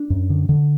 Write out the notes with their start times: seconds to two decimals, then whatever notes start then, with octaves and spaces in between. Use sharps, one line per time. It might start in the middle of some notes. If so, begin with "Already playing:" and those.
Already playing: D4
0.10 F#2
0.30 D3
0.49 D3